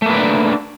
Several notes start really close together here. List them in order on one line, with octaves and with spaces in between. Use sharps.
A3 A#3 B4 D5 D4